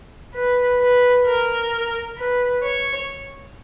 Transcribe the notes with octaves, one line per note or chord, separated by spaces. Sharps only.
B4
B4
A#4
B4
C#5